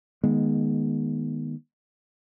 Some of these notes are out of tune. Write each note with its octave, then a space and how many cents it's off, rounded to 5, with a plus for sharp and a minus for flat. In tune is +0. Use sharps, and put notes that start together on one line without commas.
D#3 -10 G#3 +0 B3 -35